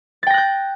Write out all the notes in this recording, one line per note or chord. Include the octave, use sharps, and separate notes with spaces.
G5 F#6 G6 A6 A#6